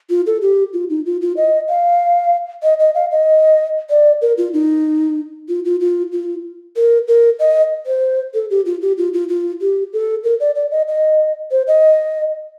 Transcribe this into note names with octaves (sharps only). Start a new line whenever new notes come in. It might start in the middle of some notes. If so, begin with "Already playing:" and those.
F4
A4
G4
F4
D#4
F4
F4
D#5
F5
D#5
D#5
F5
D#5
D5
A#4
F4
D#4
F4
F4
F4
F4
A#4
A#4
D#5
C5
A4
G4
F4
G4
F4
F4
F4
G4
A4
A#4
D5
D5
D#5
D#5
C5
D#5